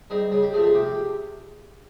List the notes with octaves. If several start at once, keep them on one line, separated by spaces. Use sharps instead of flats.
G3 C4 D#4 G#4
C#3 G#4
G4
F3 A3 C4 G#4
G#4
C3 G4